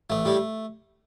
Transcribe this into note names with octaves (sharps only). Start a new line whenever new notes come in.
A1 A3
A2 G3